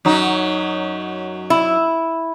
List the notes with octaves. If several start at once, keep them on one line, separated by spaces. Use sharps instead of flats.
F#2 F#3 D#4
E4